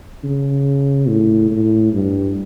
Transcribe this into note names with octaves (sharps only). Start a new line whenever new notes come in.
C#3
A2
A2
G2